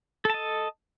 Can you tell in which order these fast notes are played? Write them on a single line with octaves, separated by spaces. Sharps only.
A4 A5 D#5